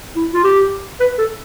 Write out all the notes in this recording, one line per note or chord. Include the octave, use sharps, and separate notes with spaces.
E4
F4
G4
B4
A4